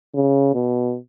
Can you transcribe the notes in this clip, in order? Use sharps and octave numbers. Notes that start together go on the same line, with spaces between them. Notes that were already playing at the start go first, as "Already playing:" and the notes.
C#3
B2